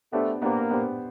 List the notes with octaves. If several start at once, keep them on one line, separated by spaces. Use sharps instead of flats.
A3 B3 D4 G4 C5
A#3 B3 D4 G4 C5
B3 D4 G4 C5